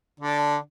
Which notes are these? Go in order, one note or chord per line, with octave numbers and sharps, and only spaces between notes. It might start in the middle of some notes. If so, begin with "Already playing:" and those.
D3 D4